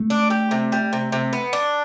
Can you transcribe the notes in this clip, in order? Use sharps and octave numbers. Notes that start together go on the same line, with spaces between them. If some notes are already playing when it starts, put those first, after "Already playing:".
Already playing: A3
D4
G4
C3
G3
C3
C3
B3
D4